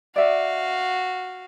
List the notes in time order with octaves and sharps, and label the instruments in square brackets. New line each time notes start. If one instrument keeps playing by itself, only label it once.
[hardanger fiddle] F#4 F5 [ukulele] D5 E5